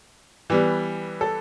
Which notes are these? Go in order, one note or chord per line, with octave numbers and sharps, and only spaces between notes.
E3 G3 B3
A4